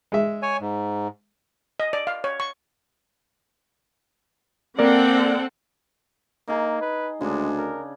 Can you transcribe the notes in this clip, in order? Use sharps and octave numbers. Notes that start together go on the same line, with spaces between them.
G#3 E5
C#5 G#5
G#2
D#5
D5
F5
C#5
C#6
A#3 C4 A4 A#4 D5 F#5
A#3 D#4 G#4
B4
D2 C#3 G#3 D4
A#4